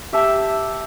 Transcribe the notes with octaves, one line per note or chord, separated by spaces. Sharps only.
G4 E5 A5